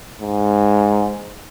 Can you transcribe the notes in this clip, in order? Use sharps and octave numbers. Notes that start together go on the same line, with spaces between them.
G#2